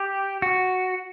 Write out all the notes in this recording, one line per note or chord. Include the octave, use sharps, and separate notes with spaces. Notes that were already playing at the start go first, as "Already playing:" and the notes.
Already playing: G4
F#4